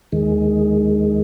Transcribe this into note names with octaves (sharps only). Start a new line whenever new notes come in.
D#2 D#3 G#3